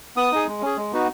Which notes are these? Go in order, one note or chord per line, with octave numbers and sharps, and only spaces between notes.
B3 D#6
D#4 G#4
G#3
C#4 G#4
G#3
B3 D#4 F#4